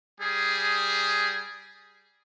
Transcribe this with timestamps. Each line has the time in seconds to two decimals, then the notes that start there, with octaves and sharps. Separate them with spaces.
0.20 G3 G#4